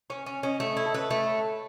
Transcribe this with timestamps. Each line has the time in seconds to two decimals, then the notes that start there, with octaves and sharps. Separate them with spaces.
0.10 C#4 C#5
0.26 C#4
0.43 C#4 D#5
0.60 A3 C#5
0.77 E4
0.86 A4
0.94 B4 C#5
1.11 A3 E5